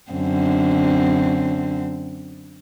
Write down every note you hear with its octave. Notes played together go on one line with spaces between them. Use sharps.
F#2 D3 C4